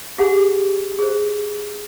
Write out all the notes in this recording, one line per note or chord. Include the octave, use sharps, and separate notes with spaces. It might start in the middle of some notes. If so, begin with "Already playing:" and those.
G4 G#4 F#5 G#5
G#4 C5